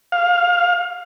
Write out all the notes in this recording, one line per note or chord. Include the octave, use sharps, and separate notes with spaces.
F5